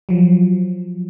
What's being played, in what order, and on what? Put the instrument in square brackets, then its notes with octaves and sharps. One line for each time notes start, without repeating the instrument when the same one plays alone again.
[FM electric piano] F3 F#3